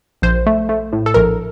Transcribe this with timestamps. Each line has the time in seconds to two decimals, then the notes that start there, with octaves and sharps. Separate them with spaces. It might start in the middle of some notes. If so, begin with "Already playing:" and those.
0.22 A#1 C5
0.46 A3
0.69 A3
0.92 A2
1.06 A4
1.14 A#1 A#4